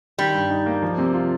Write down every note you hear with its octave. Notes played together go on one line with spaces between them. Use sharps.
D#3 G3
G2
D#4
A#3
F3
C3
F4